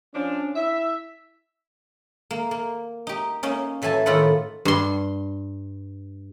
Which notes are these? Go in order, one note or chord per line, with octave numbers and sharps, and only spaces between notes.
F3 C#4 D4
E4 E5
A#3
A#3
D#4 G4
A#3 C#4 D#4
A2 E3 F#3 G#5 A5
A2 D#3 F4 A4 B4 F#5
G2 C6